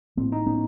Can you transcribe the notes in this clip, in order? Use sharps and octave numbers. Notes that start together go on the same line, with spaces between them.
A2 A#3 C4
D#4
B3 C#4